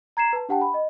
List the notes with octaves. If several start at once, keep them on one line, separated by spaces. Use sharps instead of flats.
A#5 G#6 C7 E7
B4 A5
D4 G4 F#5 G5 A5
B5
D#5